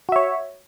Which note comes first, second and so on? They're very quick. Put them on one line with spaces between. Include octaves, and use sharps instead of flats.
F#4 E5 C#5